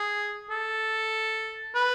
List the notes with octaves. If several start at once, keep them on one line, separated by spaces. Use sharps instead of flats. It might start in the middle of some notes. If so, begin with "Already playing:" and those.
Already playing: G#4
A4
B4